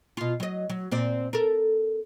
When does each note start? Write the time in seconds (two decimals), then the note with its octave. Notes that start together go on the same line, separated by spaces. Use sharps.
0.17 B2 F4
0.40 F#3 D#5
0.70 F#3
0.91 A#2 C4 D5
1.33 A4 A#4